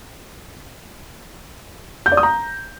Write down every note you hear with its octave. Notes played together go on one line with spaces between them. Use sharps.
G6
D5
D#6
A#5